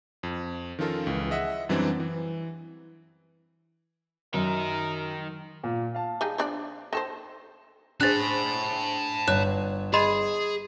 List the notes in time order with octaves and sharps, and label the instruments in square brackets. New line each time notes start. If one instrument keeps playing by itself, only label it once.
[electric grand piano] F2
D#3 F3 C#4 F4 A4 A#4
C#2 E3
G#4 D#5 E5 F#5
F#2 E3 F#3 G3 C4 D4
E3
[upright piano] F#2 [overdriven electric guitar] D#3 D#4 [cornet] A#4
[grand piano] A#2
F5 A5
[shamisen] G3 D#4 G#4
F3 D4 D5
[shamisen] D#3 A4 C5 [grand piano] A#6 E7
[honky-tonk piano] D4 G#4 C5 [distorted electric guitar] A5 B5 [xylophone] F#6 A6
[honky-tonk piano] G1 [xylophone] C#5 F#6 E7
[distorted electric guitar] G#4 [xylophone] D#5 B5 C6